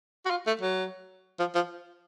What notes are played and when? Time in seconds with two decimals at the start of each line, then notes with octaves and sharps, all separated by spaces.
0.25 F#4
0.30 F4
0.47 A3
0.61 F#3
1.39 F3
1.55 F3